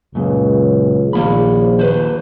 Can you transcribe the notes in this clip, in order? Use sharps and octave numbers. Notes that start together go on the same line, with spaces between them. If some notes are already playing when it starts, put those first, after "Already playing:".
C#2 F#2 A#2
A#1 D#3 A#3 B5
D#2 B4 C5